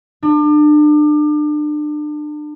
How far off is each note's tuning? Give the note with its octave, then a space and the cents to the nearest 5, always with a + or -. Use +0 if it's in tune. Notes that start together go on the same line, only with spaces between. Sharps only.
D4 +35